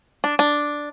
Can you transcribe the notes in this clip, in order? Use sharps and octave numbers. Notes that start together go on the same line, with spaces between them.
D4
D4